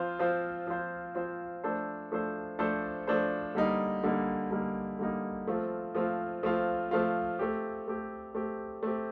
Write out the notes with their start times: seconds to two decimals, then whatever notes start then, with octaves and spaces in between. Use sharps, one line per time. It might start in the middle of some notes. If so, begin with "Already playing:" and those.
Already playing: F3 C4 F4 C5
0.19 F3 C4 F4 C5
0.67 F3 C4 F4 C5
1.15 F3 C4 F4 C5
1.64 F3 A3 D4 A4 C5
2.12 F3 A3 D4 A4 C5
2.59 F3 A3 D4 A4 C5
3.07 F3 A3 D4 A4 C5
3.55 D3 G3 A#3 D#4
4.04 D3 G3 A#3 D#4
4.51 D3 G3 A#3 D#4
4.99 D3 G3 A#3 D#4
5.47 F3 A3 C4 F4
5.94 F3 A3 C4 F4
6.43 F3 A3 C4 F4
6.91 F3 A3 C4 F4
7.39 A3 C4 G4
7.88 A3 C4 G4
8.35 A3 C4 G4
8.83 A3 C4 G4